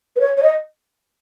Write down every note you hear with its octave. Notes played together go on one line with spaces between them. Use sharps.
B4
C#5
C#5
D#5